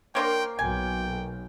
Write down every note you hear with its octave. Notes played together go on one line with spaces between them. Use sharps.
A#3 D4 A#4 C5 C#5 G5 C6
B1 G5 G#5